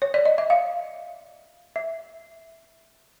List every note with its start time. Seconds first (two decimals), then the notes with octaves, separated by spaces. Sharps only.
0.02 C#5
0.14 D5
0.25 D#5
0.38 E5
0.50 F5
1.76 E5